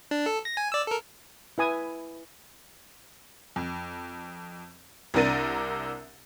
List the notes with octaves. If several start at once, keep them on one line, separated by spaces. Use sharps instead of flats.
D4
A4
A#6
G#5
D5 E6
A4 A#4
E4 B4 G#5 D#6
F2
C2 C3 D4 A#4 A6 D#7